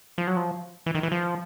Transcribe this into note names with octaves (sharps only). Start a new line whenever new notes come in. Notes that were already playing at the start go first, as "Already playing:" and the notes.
F3
F#3
F3
E3
D#3
E3
F3